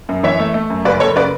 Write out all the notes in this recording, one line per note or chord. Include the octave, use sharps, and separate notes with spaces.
F#2
E3 C#5 E5
A3
A3
F#2
F#1 B4 D5
F#1 A4 C#5
C#3 B4 D5